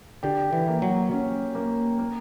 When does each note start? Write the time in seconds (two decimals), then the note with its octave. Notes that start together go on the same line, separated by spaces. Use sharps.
0.23 D3 G4
0.53 E3
0.68 A#3
0.82 F#3
1.11 C#4
1.55 A#3
1.99 A#3